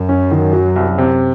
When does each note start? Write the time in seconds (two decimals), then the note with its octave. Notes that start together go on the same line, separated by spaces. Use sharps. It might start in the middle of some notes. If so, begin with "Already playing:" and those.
Already playing: F#2
0.09 C#4
0.31 D#3
0.53 F#3
0.76 C2
0.98 C3